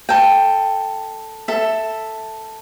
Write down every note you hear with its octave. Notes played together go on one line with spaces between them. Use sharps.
A4 G5
A4 E5